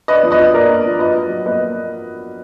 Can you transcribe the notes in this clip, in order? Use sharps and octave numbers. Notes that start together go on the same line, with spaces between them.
D4 B4 D#5
F3
B4 D#5
F4
A#3 A#4 D5
D4
F3
F4 B4 D#5
F#3
F#3
A#3 B4 D#5